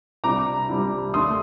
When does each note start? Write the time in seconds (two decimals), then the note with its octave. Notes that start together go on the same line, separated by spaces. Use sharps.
0.24 C2 C3 G3 D4 A#5 D6
0.69 C2 C3 G3 D4
1.14 D#2 D3 A3 D4 C6 D#6